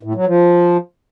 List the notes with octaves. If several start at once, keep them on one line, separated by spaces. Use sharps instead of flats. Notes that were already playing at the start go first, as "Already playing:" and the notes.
A2
F#3
F3